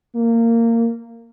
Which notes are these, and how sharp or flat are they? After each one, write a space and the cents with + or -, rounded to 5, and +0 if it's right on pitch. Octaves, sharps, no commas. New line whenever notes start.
A#3 -20